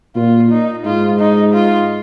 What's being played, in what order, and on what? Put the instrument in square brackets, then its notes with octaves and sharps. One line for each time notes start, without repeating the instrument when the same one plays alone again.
[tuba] A#2 [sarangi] F4
[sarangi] D#4
[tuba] G#2 [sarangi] F4
[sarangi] D#4
F4